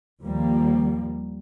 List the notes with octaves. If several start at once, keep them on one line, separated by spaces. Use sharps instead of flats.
D#2 F3 G3 A#3